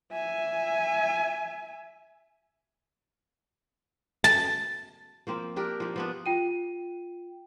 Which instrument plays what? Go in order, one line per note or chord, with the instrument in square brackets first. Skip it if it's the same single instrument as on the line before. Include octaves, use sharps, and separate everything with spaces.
[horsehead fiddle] E5 G#5
[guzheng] A5
[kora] F3 A#3 C4
D4 G4 A#4
F3 A#3
F3 B3 D4
[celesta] F4 G5 D#7